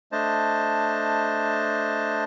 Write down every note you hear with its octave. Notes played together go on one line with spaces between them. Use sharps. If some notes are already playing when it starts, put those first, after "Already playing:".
A3 D4 C5 D#5 A5